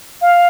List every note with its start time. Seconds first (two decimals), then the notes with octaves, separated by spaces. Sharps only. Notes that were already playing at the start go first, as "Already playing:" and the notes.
0.22 F5